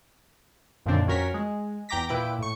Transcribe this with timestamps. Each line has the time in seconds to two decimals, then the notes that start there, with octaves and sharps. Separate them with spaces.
0.86 F#2 A#2 D3 D#3 C4 D4
1.07 F2 C#4 F#4 A#4 C#5 B6
1.34 G#3
1.89 E2 G5 A#5 D6 A#6 B6
2.09 A#2 E4 B4 G5 D6
2.39 A2 C#6